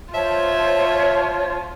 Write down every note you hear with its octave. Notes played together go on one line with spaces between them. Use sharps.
F4 C5 C#5 E5 A5